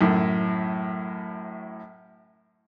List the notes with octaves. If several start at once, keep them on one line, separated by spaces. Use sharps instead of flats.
F#2 A2